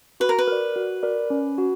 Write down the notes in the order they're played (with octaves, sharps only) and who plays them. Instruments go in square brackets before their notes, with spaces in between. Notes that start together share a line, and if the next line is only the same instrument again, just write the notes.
[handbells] F#4 [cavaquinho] B4
[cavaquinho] A#4
B4
[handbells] A#4 D5
F#4
A#4 D5
C#4
F#4